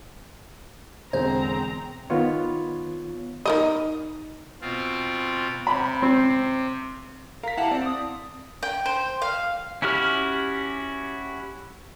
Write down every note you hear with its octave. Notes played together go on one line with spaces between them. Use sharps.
E1 D3 C4 G#4 C5 A#5
D#3 B3 F4 C#5
D#4 A#4 D#5
B2 C4 F4
C3 B5
C4
A#4 F5 B6
E4 G4 F5 F#5 A5
C4 D5
D#6
G5
C5
F5
C#4 E4 F#4 G4 F6